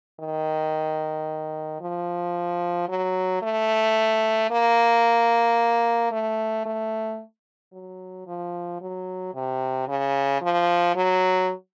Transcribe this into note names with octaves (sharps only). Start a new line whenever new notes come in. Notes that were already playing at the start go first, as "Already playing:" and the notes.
D#3
F3
F#3
A3
A#3
A3
A3
F#3
F3
F#3
C3
C#3
F3
F#3